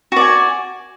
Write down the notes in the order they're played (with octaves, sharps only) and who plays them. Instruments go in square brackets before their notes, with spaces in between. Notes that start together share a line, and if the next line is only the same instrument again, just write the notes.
[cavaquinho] F#4
D5
G#5